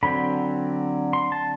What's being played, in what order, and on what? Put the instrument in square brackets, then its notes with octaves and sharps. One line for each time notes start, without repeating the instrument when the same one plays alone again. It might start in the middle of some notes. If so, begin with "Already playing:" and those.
[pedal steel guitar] D3 F#3 C4 B5
C6
A5